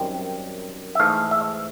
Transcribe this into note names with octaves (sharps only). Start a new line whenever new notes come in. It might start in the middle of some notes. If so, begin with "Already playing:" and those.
Already playing: F#2 D#3 G3 C4
E5
G#2 E3 A3 F5
E5